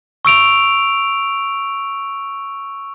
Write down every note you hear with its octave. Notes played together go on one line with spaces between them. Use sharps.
C#6 E6 D7 F7